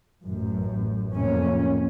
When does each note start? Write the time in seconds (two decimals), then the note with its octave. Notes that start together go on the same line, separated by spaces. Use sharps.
0.24 A1 F#2
1.14 F2 A2 C3 A#3 C#4